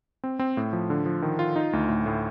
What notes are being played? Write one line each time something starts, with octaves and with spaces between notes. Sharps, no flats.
C4
C4
A2
F3
D3
F3
D#3
F4
D#4
D2
A2
A2